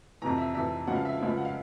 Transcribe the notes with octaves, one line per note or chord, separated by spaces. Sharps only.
F2 C3 E3 A#5
E5
F2 C3 E3 E5
C#2 C#3 F3 F#5
F5
E5
F5
C#2 C#3 F3
F#5
F5